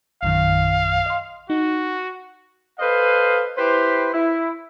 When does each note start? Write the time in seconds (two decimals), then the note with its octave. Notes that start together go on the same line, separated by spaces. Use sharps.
0.23 A#1 F#2 D#3 F5
1.06 D#5 C6
1.50 D#4 F#4
2.79 A4 B4 C5 D#5 F5
3.57 E4 G4 B4 C5
4.14 E4